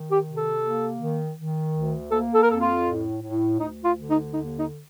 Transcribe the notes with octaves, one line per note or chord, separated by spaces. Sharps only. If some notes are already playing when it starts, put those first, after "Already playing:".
Already playing: D#3
G4
C3
A4
A#3
D#3
D#3
D2
A#3 A4
A4
A#4
F2 A4
F4
A2
A2
D2 D#4
F4
D3
D#4
D#2 D#4
D#4